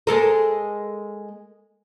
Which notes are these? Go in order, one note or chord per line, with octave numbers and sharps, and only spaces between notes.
G#3 A4 A#4